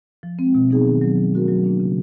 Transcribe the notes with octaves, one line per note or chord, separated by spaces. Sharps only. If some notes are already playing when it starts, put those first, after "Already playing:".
F3
G#3 C4
B2
F#3 B3 D#4 G#4
D#3
F#3 B3
F3
A3 C#4 F#4 A#4
F#3
A#3 D4
C#3